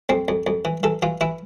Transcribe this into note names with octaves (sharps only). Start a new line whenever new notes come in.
F2 C4
F2
F2
E3
E3 A4
E3 F4
E3 E4